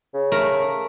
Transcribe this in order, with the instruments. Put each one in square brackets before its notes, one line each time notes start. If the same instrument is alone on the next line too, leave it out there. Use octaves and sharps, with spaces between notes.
[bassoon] C#3
[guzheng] A3 A#4